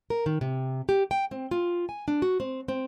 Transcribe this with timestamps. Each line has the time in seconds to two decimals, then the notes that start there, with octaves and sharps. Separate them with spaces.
0.10 A#4
0.26 D#3
0.41 C3
0.89 G4
1.11 G5
1.31 C4
1.51 F4
1.89 G#5
2.08 D4
2.22 F#4
2.40 C4
2.68 C4